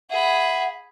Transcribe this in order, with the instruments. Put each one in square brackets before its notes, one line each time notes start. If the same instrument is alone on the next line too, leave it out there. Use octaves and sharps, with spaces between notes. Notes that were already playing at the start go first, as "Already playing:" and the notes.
[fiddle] G#4 B5 [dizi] E5 [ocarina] F#5